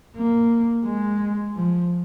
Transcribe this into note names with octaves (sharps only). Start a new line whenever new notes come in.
A#3
G#3
F3